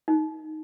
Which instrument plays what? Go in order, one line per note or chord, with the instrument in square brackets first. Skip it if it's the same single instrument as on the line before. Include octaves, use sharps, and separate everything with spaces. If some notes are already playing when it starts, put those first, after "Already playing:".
[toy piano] D#4